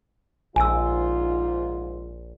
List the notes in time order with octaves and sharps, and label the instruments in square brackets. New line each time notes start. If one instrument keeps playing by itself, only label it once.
[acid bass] A#1 [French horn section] G#2 F4 [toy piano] G#5 E6